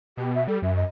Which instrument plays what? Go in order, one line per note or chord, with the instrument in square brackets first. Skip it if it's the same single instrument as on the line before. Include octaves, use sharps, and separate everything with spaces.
[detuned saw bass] B2 [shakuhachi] G4
[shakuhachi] E5
[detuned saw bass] G3 [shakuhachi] A4
[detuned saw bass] F#2 [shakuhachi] E5
[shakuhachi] D#5